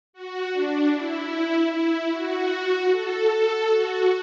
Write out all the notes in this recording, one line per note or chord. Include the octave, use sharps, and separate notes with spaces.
F#4
D4
E4
E4
F#4
A4
A4
F#4